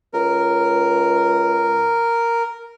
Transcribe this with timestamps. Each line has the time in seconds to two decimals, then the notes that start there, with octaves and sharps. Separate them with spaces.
0.14 C#2 A#4